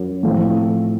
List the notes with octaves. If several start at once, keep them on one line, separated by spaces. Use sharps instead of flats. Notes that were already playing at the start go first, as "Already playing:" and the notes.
Already playing: F#2
A2 F3 A3 C4